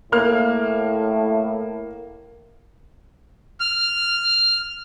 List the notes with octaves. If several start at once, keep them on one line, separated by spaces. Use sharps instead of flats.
A2 A#3 F6
F6